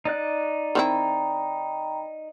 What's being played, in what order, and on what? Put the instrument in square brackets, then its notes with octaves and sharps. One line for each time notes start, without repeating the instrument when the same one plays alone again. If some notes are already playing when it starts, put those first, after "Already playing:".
[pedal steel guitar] D#4 D5 F#6
[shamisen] D#3 C4 E4 [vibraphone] G5 A#5 B5